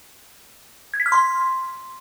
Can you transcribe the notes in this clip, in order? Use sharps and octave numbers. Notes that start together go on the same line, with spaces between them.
G#6
B6
F6
C6